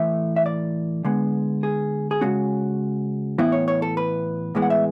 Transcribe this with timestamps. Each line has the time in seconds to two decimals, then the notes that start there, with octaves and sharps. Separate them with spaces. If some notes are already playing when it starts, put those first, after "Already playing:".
Already playing: A2 E3 A3 E5
0.36 E5
0.46 D5
1.05 D3 G#3 B3
1.63 G#4
2.11 G#4
2.21 C#3 G#3 C#4 F#4
3.38 A2 E3 B3 E4
3.52 C#5
3.68 C#5
3.82 A4
3.97 B4
4.55 A2 E3 G#3 B3
4.62 F#5
4.70 E5